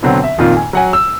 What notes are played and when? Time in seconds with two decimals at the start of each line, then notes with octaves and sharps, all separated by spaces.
0.03 B2 D3 F#3 C4
0.24 E5
0.38 F2 A#2 D#3 F4
0.57 G#5
0.73 F#3 F#5 G#5
0.93 E6